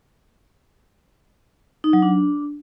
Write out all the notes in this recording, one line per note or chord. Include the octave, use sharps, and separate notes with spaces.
D#4
F#3
D4